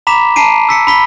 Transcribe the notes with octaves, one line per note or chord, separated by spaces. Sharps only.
A#5 B5 D6 B6 E7
A5 A#5 C7 D7 D#7
E6 B6 C#7
B5 B6 G7